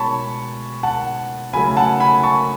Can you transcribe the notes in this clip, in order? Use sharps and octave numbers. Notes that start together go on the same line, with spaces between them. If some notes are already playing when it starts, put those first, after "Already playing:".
Already playing: B2 G#3 C#5 A5 B5 C#6
F#5 A5
C#3 F#3 A3 G#5 B5
F#5 A5
G#5 B5
A5 C#6